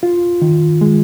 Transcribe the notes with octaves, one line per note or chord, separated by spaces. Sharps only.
F4
D#3
G#3